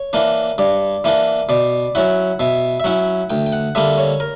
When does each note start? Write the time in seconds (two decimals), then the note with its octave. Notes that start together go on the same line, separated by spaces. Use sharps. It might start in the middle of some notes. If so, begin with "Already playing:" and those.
Already playing: C#5
0.13 E3 A#3 D4
0.58 G2 D5
1.04 E3 A#3 D4
1.49 B2 D5
1.95 F#3 C#4 E4 F#5
2.40 B2 E5
2.80 E5
2.84 F#3 C#4 E4 F#5
3.30 D2 G5
3.46 G5
3.52 F#5
3.75 D3 G3 A#3 E5
3.98 C#5
4.20 A#4